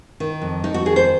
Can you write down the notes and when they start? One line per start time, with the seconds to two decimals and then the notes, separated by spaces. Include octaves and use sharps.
0.20 D#3
0.41 F2
0.64 F2 D#4
0.74 F#4
0.86 D#3 G#4
0.96 C5